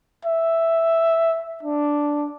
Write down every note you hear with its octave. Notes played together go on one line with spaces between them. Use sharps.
E5
D4